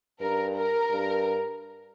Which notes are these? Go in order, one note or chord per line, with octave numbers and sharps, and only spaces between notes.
G2 A#4
A#4
G2